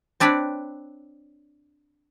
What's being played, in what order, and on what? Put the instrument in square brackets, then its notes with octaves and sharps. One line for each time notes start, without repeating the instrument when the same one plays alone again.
[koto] C4 D4 B4 C#5 D5